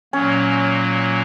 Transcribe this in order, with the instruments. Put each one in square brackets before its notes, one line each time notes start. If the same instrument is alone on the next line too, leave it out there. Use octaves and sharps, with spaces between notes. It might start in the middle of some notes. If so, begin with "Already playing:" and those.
[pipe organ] A#2 F#3 A#3 [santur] C#4